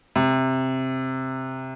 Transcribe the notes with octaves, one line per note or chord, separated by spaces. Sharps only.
C3